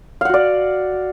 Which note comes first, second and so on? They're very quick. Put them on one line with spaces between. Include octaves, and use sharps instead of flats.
F5 F#5 F#4 D5